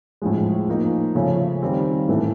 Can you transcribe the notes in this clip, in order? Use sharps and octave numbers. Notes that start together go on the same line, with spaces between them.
A2 F3 G#3
F3 A#3 D#4
C#3 F3 A3 C#4
D#3 G3 C4
A2 E3 A3